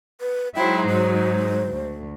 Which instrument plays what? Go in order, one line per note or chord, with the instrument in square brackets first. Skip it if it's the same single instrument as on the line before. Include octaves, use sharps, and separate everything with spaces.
[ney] B4
[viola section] F#3 G#3 D#4 [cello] E4 C5 [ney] G5
[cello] G#2 [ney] C5
[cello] D2